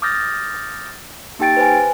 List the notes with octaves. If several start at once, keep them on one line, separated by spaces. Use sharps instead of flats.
D6 D#6 F6 G6 A6 A#6
A#3 D#4 G4 G5 A6 D7
B4 C5 G#5